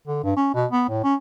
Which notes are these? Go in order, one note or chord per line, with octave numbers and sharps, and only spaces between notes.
D3
G2
C#4
B2
B3
A2
C#4